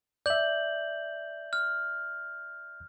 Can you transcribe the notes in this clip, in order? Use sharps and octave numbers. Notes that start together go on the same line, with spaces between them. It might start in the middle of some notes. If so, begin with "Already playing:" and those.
D5 E5 G6 F#7
F6